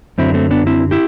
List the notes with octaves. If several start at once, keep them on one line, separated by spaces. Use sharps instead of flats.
F#2 D3 F#3 C4 E4
A3 C4
B3 D4
C4 E4
E4 G4